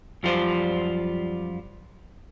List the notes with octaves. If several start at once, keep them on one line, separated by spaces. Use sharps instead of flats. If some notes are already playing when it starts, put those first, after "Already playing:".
F#2 F3 G3 F4 C5 D5